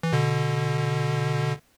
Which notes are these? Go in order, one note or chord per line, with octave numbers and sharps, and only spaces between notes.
E3
B2 D3